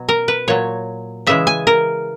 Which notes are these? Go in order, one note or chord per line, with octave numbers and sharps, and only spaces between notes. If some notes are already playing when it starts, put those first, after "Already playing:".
Already playing: B2 F#3
A#4
B4
A#2 F#3 C#5
C#3 E3 G#3 E5
G#5
A#4